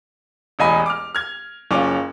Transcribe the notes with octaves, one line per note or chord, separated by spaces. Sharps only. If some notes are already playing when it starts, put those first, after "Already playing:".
E1 A1 D#5 G#5 B5
D6 F6
F6 G#6
F#1 C#4 F4 D6